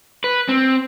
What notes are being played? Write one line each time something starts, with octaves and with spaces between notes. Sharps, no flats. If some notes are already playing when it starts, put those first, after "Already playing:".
B4
C4